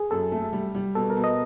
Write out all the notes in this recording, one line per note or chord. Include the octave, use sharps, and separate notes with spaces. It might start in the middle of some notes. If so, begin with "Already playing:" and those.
Already playing: G#4
F#2 A4
A3
G3
G3
B2 A4
A#4
B2
D#5